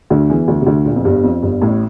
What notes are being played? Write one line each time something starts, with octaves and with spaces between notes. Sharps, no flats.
D2 D3
E2 E3
D2 D3
C3
D2 D3
A#1 A#2
F2
G1 G2
F2
G1 G2
A1 A2